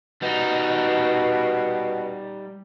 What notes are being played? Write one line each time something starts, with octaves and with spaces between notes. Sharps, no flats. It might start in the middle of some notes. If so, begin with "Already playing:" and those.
B2 G3 D#4